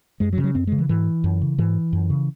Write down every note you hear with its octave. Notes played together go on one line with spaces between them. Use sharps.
F#2 G#3
F#3
C#3
F#3
F#2 C4
C#3 G#3
E3
G#2 E3
F#2
C#3
G#2 E3
F#2
C#3